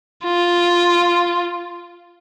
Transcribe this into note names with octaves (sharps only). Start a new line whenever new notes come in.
F4